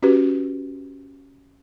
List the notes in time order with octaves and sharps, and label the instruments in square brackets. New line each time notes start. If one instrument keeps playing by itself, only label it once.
[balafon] C#4 F#4 G4 B4